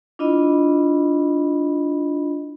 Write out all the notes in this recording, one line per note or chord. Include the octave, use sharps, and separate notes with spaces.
D4 E4 F4 D#5 B5